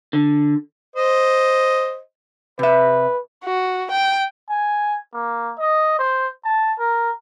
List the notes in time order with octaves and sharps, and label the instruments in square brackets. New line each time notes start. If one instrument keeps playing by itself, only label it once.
[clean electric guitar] D3
[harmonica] C5 D#5
[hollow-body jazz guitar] C3 E5 [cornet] B4
[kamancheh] F#4
G5
[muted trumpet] G#5
A#3
D#5
C5
A5
A#4